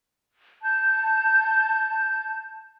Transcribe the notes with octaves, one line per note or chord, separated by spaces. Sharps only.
A5 G6